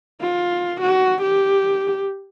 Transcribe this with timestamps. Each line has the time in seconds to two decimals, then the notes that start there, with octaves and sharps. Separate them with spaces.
0.21 F4
0.81 F#4
1.22 G4